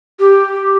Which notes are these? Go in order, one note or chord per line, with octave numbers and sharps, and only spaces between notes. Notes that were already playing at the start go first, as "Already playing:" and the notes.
G4